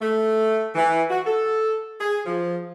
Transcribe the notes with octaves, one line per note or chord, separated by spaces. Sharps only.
A3
E3
F#4
A4
G#4
F3